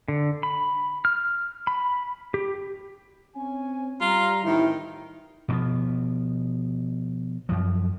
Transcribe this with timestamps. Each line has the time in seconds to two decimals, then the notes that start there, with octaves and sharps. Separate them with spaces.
0.08 D3
0.43 B5
1.05 F6
1.67 B5
2.34 G4
3.35 C4 C#4 G#5
4.01 G3 F4 A#5
4.44 A1 D#3 F3 E4
5.48 B2 F3 B3
7.49 F#2 F3